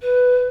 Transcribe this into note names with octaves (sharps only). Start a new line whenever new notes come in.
B4